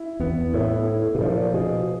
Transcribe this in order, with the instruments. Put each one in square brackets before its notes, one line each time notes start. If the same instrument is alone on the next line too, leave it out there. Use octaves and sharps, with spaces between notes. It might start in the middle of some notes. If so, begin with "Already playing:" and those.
Already playing: [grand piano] E4
[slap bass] E2 [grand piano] B3
[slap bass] A2 [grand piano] E4
[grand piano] E4
[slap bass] B2
[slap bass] A#2 [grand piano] F3
[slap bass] B2 [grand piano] G#4